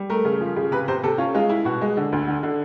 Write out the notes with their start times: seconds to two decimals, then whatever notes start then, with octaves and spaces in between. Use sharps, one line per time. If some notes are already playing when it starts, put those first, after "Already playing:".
Already playing: G3
0.10 A3 A#4
0.25 C#3
0.41 F3
0.56 C#3
0.71 C3 B4
0.88 C3 C5
1.03 C3 A4
1.18 C#4 F4
1.34 G#3 F4
1.49 E4
1.65 B2 F#4
1.81 G#3
1.97 D3
2.12 D2
2.28 D3
2.43 D3